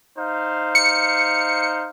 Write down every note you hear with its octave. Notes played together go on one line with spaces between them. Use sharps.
D#4 C5 F5
C#7